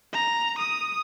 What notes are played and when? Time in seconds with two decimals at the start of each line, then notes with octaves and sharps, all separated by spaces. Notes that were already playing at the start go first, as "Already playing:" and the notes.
0.13 A#5
0.58 D#6